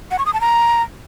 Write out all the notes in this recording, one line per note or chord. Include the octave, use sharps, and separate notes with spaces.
F#5
C#6
D#6
A5
A#5